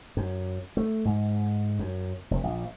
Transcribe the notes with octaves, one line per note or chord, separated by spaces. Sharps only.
F#2
A3
G#2
F#2
F1
A#1